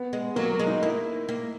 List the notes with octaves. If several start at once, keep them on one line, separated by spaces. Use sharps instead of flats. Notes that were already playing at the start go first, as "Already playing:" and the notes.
Already playing: B3
G#3
F#3 A#3
A#3
G#3
D#4
A#3 E4
A#3